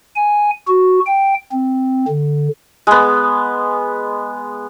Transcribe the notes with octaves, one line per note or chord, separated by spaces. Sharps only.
G#5
F#4
G5
C4
D3
G#3 B3